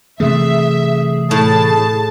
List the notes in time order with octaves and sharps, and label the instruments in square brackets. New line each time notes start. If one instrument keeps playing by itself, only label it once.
[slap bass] C3 E3 A3 [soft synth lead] G#4 [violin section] E5
[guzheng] A2 [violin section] A5